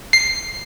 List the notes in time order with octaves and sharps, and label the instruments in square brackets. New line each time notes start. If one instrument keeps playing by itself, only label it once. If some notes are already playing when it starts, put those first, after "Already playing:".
[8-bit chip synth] C7